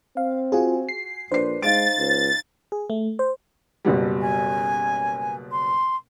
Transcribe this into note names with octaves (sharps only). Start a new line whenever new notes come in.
C4 F5
F4 F#4 G#4 G#5
C7
A#1 D4 B4 C5 C7
G#3 D#4 F5 A6 D7
C#2
G#4
A3
C5
F#1 B2 G3
G#5
C6